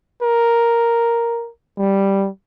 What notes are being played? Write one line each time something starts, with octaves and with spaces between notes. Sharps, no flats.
A#4
G3